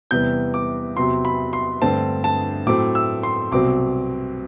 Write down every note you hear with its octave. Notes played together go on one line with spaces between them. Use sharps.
E2 C3 E3 G3 B3 G6
D6
E2 C3 F#3 C6
B5
C6
G2 D3 A3 C4 A5
A5
A2 F#3 A3 C4 D6
E6
C6
C2 B2 F#3 C4 D6